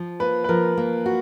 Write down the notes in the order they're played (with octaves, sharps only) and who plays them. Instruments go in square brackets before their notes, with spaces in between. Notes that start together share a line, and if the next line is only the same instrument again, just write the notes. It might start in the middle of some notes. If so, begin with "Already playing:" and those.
Already playing: [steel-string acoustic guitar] F3
[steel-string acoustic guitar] A#3 [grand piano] B4
[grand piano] B4
[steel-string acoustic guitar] F3 [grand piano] A#4
[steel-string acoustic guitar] A#3
F#4